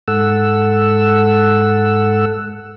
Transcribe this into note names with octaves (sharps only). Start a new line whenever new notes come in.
G#2 A4 F#5 E6